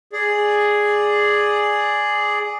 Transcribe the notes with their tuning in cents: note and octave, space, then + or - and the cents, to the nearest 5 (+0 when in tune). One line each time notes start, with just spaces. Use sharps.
G#4 +0 D5 +0